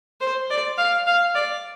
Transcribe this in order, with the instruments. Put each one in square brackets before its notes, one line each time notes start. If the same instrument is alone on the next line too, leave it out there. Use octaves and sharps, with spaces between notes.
[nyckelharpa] C5
D5
F5
F5
D5